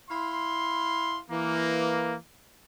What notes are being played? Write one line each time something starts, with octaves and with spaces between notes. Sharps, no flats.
E4 F5 C6
E3 A#3